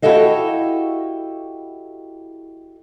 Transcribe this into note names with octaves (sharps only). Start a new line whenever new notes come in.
E4 F#4 G4 A4 D#5 F5